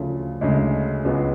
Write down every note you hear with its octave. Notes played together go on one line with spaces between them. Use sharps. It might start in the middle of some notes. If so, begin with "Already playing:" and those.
Already playing: D2 C#3 F3 A3 F4
D2 C#3 G#3
C#2 C#3 G#3 B3 F#4